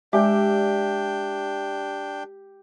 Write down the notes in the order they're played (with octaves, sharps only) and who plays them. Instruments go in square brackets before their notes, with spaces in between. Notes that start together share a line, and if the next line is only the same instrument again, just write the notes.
[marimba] G#3 [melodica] D4 G5 [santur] G4 E6 [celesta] D5 E5